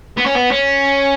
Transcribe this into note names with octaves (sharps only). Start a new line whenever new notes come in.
B3
C#4
B3
C#4